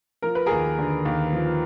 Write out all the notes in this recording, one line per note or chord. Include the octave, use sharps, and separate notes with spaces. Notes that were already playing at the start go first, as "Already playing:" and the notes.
F3 A#4
B4
D#2 G#4 A#4
D3
D#2
F3